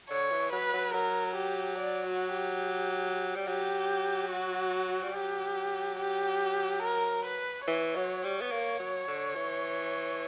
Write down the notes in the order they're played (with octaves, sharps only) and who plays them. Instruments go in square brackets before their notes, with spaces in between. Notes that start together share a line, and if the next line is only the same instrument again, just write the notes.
[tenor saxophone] D3 [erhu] C#5
[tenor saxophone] E3
[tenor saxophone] F#3 [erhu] B4
[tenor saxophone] F#3
[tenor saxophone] F#3 [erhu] A#4
[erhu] G4
D5
F#4
G4
[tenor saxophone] G3
[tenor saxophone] F#3 [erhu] G4
[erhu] F#4
[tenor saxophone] G3
[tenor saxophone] F#3 [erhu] G4
[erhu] G4
A#4
B4
[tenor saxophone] E3 [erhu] C#5
[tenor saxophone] F#3
G3
B3
A#3
F#3
D3
E3